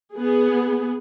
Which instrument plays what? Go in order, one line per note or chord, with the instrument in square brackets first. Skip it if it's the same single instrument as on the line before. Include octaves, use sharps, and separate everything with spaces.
[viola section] B3 G#4